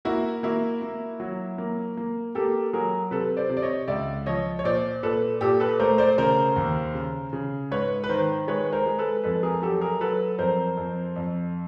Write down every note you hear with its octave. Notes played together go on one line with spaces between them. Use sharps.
A#3 E4 F#4
A#3 E4 F#4
A#3
F#3
A#3
A#3
A#3 G4 A4
F#3 G#4 A#4
C3 A4 B4
C5 D5
C3
D5
C#5 D#5
C#2 D5 E5
F3 C#5 D#5
C#5
A#2 C5 D5
A#2 A4 B4
A#2 G4 A4
A4 B4
A3 A#4 C5
C5 D5
C#3 A#4 C5
D#2
C#3
C#3
G#2 B4 C#5
B4
D#3 A#4 C5
G#3 B4 C#5
A#4 C5
G#3
A4 B4
F2 A4 B4
G#4 A#4
F#3 G4 A4
G#4 A#4
F#3 A4 B4
F2 A#4 C5
F2
F2